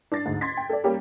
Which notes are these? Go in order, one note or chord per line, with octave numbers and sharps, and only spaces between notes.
D4 A6 C7
D2 G#2
C6 G#6 A6 B6
G5
A4 D5
G3 A#3 C#4 G4